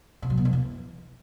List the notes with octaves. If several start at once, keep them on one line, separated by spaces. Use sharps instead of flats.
C3
F#3
B2
F2
E3